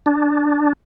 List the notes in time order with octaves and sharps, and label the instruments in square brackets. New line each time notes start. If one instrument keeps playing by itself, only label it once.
[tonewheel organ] D4